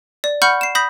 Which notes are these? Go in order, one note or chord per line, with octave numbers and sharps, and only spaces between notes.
D5
F#5 B5 C#6 F6 G6 C#7
C7 E7
B5 D#6 G6 A#6 B6